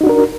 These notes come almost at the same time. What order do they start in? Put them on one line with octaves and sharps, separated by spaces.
D#4 F#4 D4 A#4